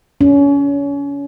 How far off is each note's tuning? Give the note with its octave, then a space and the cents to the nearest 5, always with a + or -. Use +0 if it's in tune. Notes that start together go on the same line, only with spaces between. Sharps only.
C#4 +30